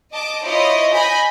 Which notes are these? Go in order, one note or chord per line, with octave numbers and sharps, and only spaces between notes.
D#5 A5 D6
E4 F4 C5 C#5 D#5
D#5 G#5 B5 G6 A#6